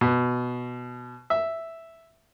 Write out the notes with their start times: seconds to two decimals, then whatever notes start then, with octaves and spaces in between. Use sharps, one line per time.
0.01 B2
1.30 E5